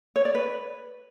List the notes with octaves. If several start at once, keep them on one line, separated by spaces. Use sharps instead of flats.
C#5
D5
B4